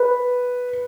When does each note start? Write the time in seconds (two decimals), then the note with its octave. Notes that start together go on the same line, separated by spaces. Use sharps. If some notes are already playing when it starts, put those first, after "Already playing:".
Already playing: B4